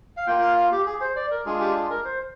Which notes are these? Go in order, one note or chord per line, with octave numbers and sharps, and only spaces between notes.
F5
A#3 F4 G5
F5
F5
G4
G#4
C5
D5
A#4
G#3 D4 F4 G#4
G4
G#4
A#4
C5